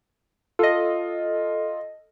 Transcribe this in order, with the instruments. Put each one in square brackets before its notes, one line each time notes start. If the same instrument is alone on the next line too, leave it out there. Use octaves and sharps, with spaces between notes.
[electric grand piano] F4 [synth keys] A4 D#5